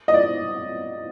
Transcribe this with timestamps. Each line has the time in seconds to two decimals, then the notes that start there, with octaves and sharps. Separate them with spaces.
0.08 D#5
0.14 D5